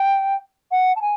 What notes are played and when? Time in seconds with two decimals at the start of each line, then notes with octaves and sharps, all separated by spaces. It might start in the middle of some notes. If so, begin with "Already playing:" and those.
Already playing: G5
0.71 F#5
0.96 A5
1.01 G#5